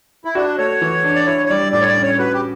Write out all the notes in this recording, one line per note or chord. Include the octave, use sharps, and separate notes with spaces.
E4
D4 F#4
A3 C#5
E3
D4
D5
E4 C#5
C#5
G3 D5
A2 D5
C#5
D5
C#4
C#5
F#4 B4
G4